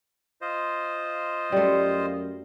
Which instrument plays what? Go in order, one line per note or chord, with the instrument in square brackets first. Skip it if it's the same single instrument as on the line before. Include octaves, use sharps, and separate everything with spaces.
[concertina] F4 C5 D#5
[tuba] F#2 [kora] G3 A3